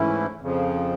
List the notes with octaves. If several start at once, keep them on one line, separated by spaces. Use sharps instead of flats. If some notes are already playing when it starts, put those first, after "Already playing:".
Already playing: G#2 E3 A3 C#4 E4
F2 C#3 F3